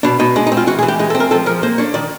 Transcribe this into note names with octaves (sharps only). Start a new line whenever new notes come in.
B2 D4
B2 D#4
G#3 D4
D#4
C4
F4
E3 F#4
G#4
E3
G4
G#3 G#4
A4
C4
A#4
F3 A4
F3 A#4
A#3 C5
D4 C#5
D#3 D5